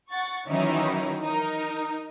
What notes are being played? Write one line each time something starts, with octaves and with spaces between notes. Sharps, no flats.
F#5 C#6 A6
D#3 E3 F#3 C#4 D#4 E4
D#4 A#4